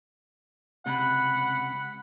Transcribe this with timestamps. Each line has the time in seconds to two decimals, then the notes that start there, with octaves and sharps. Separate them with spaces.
0.86 C#2 C3 F#5 B5